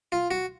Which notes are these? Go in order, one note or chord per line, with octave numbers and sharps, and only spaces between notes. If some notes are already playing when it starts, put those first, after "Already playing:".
F4
F#4